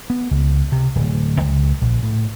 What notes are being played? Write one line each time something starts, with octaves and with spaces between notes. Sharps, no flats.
B3
C#2
C3
D1
C#2
A#1
A2